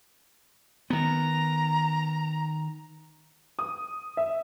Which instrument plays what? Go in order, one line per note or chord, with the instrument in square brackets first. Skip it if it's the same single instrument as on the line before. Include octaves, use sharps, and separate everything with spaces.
[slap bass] D#3 B3 [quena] A#5
[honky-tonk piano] D#6
E5